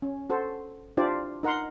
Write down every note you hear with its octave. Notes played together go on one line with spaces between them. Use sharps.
C#4
F#4 A4 C5
D4 E4 F4 G4 C5 D5
D#4 A#4 F#5 A#5 C6